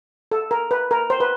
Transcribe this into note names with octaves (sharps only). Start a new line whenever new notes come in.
A4
A#4
B4
A#4
C5
B4